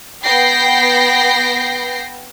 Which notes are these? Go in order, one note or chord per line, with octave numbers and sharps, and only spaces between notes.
B3 G5 G6 A#6 C7